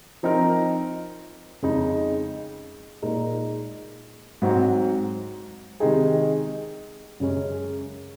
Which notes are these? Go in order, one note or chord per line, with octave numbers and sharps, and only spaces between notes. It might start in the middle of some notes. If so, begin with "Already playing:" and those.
F3 C4 D#4 A#4
F2 C#3 G#3 D#4
A#2 G#3 D#4 A#4
G#2 F#3 C4 F#4
C3 D#3 G#3 D#4 G#4
F#2 C#3 G#3 C#4